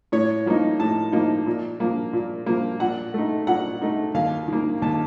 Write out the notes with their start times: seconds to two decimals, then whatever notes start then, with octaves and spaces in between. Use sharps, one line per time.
0.12 A2 C#5
0.46 F3 A#3 D#4
0.79 A2 A5
1.12 F3 A#3 D#4
1.46 A#2
1.80 F3 A#3
2.13 A#2
2.46 F3 A#3
2.80 A#2 F#5
3.14 A3 D#4
3.47 A#2 F#5
3.82 A3 D#4
4.14 D#2 F5
4.48 D#3 A#3
4.82 D#2 A5